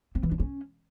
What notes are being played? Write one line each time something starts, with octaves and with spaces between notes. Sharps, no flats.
C4
E3
D4
C#4